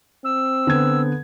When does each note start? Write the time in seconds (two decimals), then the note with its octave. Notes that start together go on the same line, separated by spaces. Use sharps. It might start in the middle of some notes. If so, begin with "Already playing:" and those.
0.24 C4 E6
0.67 D3 B3 G#6